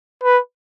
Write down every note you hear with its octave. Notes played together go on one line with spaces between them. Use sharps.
B4